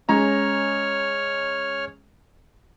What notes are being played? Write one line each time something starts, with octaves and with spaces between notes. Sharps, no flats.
G#3 C#4 C#5 A#5 F6